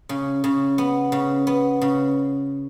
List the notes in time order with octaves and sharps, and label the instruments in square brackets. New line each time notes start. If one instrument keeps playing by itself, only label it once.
[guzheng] C#3
C#3
B3
C#3
B3
C#3